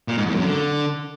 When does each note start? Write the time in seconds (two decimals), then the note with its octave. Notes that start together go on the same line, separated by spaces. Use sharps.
0.08 A#2
0.17 G#2
0.26 E2
0.35 F#2
0.44 D3